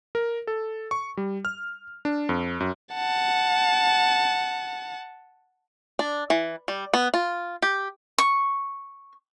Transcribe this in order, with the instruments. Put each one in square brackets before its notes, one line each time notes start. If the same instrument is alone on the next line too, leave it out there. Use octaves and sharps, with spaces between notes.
[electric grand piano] A#4
A4
C#6
G3
F6
D4
F2
F#2
[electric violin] F#5 A5
[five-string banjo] D4
E3
G3
B3
F4
G4
[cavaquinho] C#6